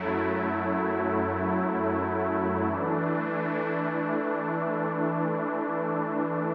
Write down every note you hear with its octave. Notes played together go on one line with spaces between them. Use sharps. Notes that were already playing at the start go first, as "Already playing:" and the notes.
Already playing: F#2 F#3 A3 E4
E3 A3 D4